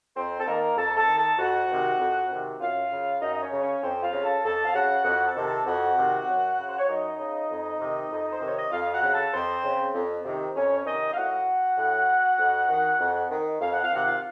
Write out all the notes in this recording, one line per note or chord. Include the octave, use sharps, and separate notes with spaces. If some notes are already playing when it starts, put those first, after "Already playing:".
F2 C4 C5
A4
D#3 A#3 A#4
F2 A4 A5
A4 A5
D#3
A4 A5
F2 F#4 F#5
C3 D#3
F2
C3 D#3
F#2 F4 F5
C#3
F#2 D#4 D#5
D#5
C#4 C#5
C#3
C#4 C#5
F2 C4 C5
F4 F5
C#3
A4 A5
F2 A4 A5
F5
C#3 F#4 F#5
F2 F#4 F#5
A4 A5
C3 D#3
A4 A5
F2 F#4 F#5
C3 D#3
F#2
C#3
C5
C#5
F#2 D#4 D#5
C#3
F2
C3 D#3
F2
C5
C3 D#3 C#5
D#5
F2 F4 F5
F#4 F#5
C#3
A4 A5
F2 C4 C5
C#3
F2
C3 D#3
F2 C#4 C#5
C#5
C3 D#3 D#4 D#5
F5
A2 F#4 F#5
A2
F2
D#3
F2
D#3
F2 F5
F#5
F5
C3 D#3 F#5
F4 F5